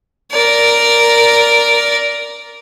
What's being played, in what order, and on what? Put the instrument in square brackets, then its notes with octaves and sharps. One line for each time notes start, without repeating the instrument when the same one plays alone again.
[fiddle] A#4 D5